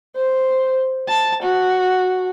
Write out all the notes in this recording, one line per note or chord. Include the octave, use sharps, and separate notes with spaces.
C5
A5
F#4